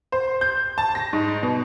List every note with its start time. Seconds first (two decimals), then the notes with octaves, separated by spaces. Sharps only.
0.12 C5
0.41 G6
0.78 A5
0.95 A#6
1.13 G#2
1.43 B2